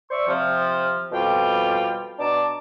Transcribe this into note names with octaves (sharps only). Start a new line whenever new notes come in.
C5 D5 E5 C#6
C3 F3
F2 B2 G3 F4 G5
B2 D4 A5 A#5 D6